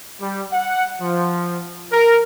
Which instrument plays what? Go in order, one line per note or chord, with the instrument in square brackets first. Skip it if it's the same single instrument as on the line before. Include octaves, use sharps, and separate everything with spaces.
[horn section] G3
F#5
F3
A#4